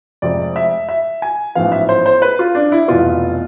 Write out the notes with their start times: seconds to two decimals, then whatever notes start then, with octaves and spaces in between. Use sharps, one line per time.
0.22 F1 F2 C3 G#3 C4 D5
0.56 E5
0.89 E5
1.22 G#5
1.55 A1 G#2 F3 B3 F5
1.72 E5
1.89 C5
2.06 C5
2.22 B4
2.39 F4
2.55 D4
2.72 E4
2.88 F1 E2 B2 B3 F4